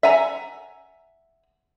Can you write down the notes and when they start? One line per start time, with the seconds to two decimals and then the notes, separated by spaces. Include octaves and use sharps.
0.03 E5 F#5 G#5 A#5